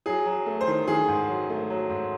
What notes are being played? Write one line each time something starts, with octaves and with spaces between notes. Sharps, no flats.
F#3 G#4
F#3
A3
C5
D#3
D#3 G#4
G#2
F#3
A3
F#3
G#2